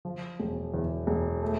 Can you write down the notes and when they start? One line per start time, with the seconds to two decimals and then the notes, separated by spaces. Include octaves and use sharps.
0.05 F3
0.40 E1
0.74 E2
1.07 E1
1.43 A3